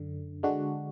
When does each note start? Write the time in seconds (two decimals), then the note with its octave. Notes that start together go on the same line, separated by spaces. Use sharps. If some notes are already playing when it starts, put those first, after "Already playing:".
Already playing: F#2 D3
0.43 D3 G#3 D4 F#4